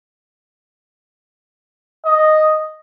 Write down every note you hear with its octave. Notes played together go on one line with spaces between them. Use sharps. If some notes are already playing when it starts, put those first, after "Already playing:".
D#5